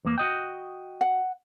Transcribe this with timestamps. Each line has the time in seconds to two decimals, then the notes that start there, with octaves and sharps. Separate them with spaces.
0.05 E2 A#3
0.18 F#4 D#5 G5
1.01 F#5